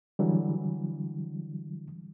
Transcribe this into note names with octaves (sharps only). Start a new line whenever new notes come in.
D3 E3 F#3 G3